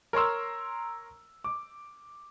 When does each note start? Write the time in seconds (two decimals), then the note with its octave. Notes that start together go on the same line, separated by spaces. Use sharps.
0.13 A#4 C#5 A#5 C6 E6
1.44 D6